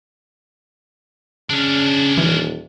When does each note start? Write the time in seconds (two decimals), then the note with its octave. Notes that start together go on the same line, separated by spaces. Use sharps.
1.50 C#3 C#4 D4
2.18 D#1 E3